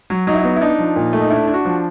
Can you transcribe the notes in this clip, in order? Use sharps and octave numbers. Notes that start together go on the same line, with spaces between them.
F#3
F#3 D#4
E4
B3 D#4
E4
D4 D#4
F3
A#2
A3
D#4
D4 E4
D4
F#4
F3